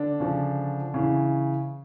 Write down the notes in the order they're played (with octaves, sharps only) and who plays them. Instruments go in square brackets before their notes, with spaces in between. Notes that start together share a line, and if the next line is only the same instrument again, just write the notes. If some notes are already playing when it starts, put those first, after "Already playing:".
Already playing: [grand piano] D3 D4
C#3 F3
C#3 E3